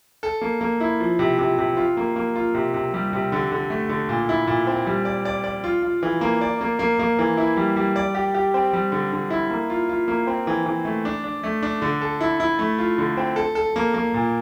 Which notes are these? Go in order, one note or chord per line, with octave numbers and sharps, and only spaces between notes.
A4
A#3
A#3
E4
F3
C3
C3
C3
F4
A#3
A#3
F4
C3
C3
G3
C3
D3
D3
A3
D3
A#2
E4
A#2
C4
G3
D5
D5
D5
F4
F4
E3
A#3
D5
A#3
A#3
A#3
E3
E4
G3
G3
D5
G4
G4
C4
G3
D3
D3
E4
A#3
F4
F4
A#3
C4
E3
E3
A3
D4
D4
A3
D4
D3
A4
E4
E4
A3
F4
D3
C4
A4
A4
A#3
A#3
A#2